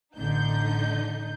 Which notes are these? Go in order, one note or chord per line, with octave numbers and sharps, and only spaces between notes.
A1 D3 D#4 G6